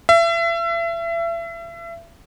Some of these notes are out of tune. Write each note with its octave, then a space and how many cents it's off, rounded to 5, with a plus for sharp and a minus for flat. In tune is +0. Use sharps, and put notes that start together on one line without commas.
E5 +35